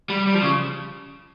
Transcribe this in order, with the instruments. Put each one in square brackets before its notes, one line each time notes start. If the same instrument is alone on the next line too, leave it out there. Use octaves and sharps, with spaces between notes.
[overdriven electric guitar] G3
G3
F3
C#3